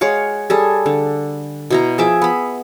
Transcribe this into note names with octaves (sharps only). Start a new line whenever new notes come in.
G#3 C#5 F5 F#5
G3 G#4 A4
D3
B2 E4 A#5
F3 G#4 E5 D6
B3 B5